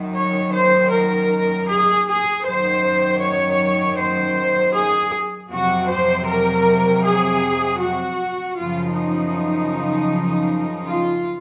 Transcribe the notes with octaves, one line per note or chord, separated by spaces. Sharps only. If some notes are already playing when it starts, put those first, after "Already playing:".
Already playing: F#2 D#3 F#3
C#5
C5
A#4
G#4
G#4
F#2 D#3 F#3 C5
C#5
C5
G#4
F2 C3 F#3 F#4
C5
A#4
G#4
F#4
F#2 C#3 F3 F4
D#4
F4